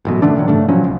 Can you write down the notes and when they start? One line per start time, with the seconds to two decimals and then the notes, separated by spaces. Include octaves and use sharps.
0.05 A1 F#2 B2
0.22 D3 E3 A3 D4
0.35 A#2 D#3 F3 F#3
0.48 G2 C#3 A3 D4
0.69 B2 F3 F#3 C#4
0.84 B1